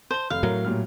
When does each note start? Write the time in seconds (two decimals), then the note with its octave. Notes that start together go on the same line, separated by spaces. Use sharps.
0.11 C5 A5 G7
0.30 F1 F5
0.43 A2 F#3 A#4
0.65 A#2 G3 F6